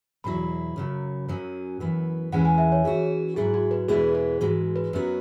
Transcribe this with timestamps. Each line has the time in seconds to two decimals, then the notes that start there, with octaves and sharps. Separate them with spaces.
0.24 E2 B2 F#3 E4 B5
0.76 F#2 C#3 F#3
1.28 F#2 F#3 C#4
1.80 F#2 E3 B3
2.32 E2 E3 G#3 C#4 F#5
2.45 G#5
2.58 E5
2.72 C#5
2.84 E3 C#4 F#4 G#4
3.36 G#2 F#3 E4 G#4
3.54 F#4
3.71 B4
3.88 E2 B2 G#3 B3 E4 G#4
4.15 G#4
4.41 G#2 E3 G#3 F#4
4.76 B4
4.93 F#2 F#3 B3 F#4